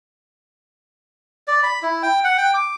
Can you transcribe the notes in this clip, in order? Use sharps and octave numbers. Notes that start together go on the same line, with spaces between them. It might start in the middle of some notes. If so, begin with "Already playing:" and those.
D5
B5
E4
G5
F#5
G5
D6